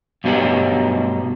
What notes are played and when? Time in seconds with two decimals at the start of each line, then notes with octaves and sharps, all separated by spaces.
0.24 G2 B2 F#3 D#4 G4 B4